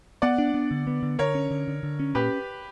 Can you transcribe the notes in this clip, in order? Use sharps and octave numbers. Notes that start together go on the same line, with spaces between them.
B3 D5 F#5
D4
B3
D3
B3
D3
D3 A#4 C#5
C#4
D3
D3
D3
C#4
A#2 G4 B4